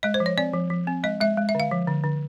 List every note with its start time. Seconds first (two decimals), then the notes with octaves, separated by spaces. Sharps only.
0.03 G#3 D#5
0.14 C5
0.20 F3
0.26 C#5
0.37 C4 D5
0.53 F3
0.70 F3
0.87 C4
1.04 G#3 D#5
1.20 G#3 E5
1.37 G#3
1.49 E5
1.55 D3 F5
1.71 F3
1.87 D3
2.04 D3